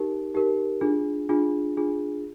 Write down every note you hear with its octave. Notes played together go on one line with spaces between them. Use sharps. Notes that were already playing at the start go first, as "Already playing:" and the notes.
Already playing: D#4 G4 A#4
D#4 G4 A#4
D4 F4 G#4
D4 F4 G#4
D4 F4 G#4